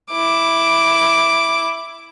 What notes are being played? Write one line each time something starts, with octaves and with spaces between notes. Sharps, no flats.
E4 D6